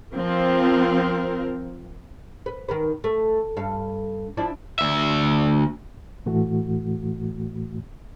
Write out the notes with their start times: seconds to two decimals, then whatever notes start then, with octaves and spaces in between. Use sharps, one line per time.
0.15 F3 C4 A#4
2.46 B4
2.69 D#3 A#4 B4
3.04 A3
3.57 G2 A4 F5
4.37 F3 D4 E4
4.79 D2 E5
6.26 A2 E3 A3 F#4